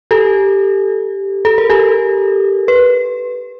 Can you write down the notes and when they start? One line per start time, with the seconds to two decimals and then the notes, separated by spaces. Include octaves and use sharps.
0.11 G4 A4
1.45 A4
1.58 A#4
1.70 G4 A4
2.68 B4